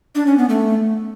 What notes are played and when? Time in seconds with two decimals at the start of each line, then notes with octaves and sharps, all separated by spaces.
0.15 D4
0.27 C#4
0.38 B3
0.49 A3